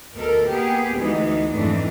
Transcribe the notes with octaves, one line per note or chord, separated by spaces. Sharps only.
D2 B2 A4 A#4
A#3 B3 G4 G#4
D2 E3 G#3 B3 D#4
F2 G#2 E3 A3 D4